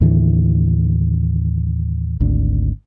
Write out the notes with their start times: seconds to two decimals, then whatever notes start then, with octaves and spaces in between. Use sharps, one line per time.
0.01 D#2 A2 D3 E3
2.20 G#1 D2 D3